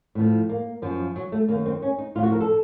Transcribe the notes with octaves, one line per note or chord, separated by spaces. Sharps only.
A2 F3
A#3
F#2 F3
F#3
A3
F#2 D#3 A#3
C4
C#4
D#4
A2 F3 F4 F#4
A#4
A4